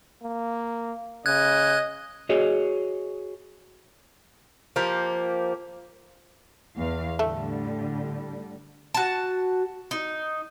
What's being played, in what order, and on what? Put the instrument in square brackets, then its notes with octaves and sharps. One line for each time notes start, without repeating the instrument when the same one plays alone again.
[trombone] A#3
[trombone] C#3 [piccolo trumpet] D#5 [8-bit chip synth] F#6 G#6
[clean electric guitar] F#4 G#4 C#5 D#5
[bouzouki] F3 A#3 G4
[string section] E2 F5
[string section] A2 D3 G3 [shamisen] A3
[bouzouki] F#4 A5
D#4